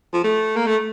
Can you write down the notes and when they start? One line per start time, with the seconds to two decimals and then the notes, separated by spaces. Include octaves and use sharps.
0.13 F3
0.24 A3
0.56 A#3
0.67 A3